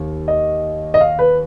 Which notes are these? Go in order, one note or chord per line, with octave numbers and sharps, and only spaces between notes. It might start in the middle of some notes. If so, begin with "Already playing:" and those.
Already playing: D#2
D#5
D#5
F5
B4